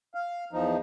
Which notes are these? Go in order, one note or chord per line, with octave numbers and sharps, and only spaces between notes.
F5
E2 F3 D#4